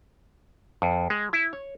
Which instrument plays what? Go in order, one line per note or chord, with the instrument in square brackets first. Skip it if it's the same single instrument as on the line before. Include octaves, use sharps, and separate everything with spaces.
[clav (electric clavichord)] F2
G#3
E4
C#5